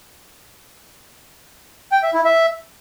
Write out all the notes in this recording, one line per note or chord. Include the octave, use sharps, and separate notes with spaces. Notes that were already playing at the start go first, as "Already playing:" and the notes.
G5
E5
E4
E5